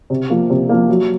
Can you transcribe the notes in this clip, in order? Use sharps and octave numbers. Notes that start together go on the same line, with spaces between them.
C3
F3 A#3
C3
F3 A#3
F#3